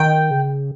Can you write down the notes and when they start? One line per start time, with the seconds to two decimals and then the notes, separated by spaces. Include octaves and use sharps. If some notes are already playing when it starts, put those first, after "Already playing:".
Already playing: D#3 G5
0.31 C#3